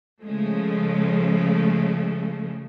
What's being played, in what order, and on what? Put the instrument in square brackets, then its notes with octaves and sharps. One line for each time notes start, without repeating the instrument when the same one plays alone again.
[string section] C#3 F3 G#3 A3